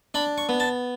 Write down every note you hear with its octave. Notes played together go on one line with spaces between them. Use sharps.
D4 B5
C#6
B3
A5